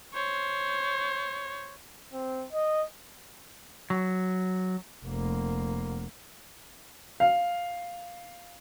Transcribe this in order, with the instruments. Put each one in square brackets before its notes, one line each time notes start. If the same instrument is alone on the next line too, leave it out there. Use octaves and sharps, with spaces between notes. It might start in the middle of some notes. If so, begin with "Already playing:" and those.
[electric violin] C5 C#5
[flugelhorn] C4
D#5
[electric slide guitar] F#3
[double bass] F1 A#3
[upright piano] F5